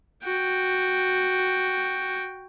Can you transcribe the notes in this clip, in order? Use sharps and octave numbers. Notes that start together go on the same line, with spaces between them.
F#4 G5